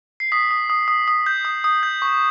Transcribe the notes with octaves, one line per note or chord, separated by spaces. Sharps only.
C7
D#6 B6
D#6
D#6
D#6
D#6
G6
D#6
D#6
G6
C#6